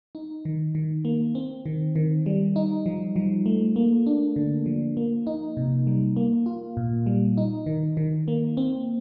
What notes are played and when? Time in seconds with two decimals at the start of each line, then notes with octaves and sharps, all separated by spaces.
0.15 D#4
0.45 D#3
0.75 D#3
1.05 A#3
1.35 C4
1.66 D#3
1.96 D#3
2.26 G3
2.56 D#4
2.86 F3
3.16 F3
3.46 A3
3.76 A#3
4.06 D4
4.36 D3
4.66 F3
4.97 A#3
5.27 D#4
5.57 C3
5.87 G3
6.16 A#3
6.46 F4
6.77 A#2
7.06 G3
7.37 D#4
7.66 D#3
7.97 D#3
8.28 A#3
8.57 C4